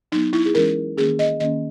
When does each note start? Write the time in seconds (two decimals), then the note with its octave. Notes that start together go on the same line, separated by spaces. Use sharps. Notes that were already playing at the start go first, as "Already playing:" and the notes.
0.12 F#3 B3 D#4
0.33 E4
0.46 G#4
0.55 E3 G#3 C#4 A#4
0.97 D#3 A#3 C#4 G#4
1.19 D#5
1.40 D#3 A#3 C#4 D#5